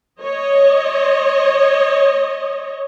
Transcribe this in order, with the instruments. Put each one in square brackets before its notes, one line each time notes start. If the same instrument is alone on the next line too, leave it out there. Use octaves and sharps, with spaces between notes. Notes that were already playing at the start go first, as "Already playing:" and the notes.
[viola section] C#5 D#5